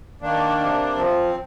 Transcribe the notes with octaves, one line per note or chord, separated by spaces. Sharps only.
D#3 A#3 D4
C3
F3 C4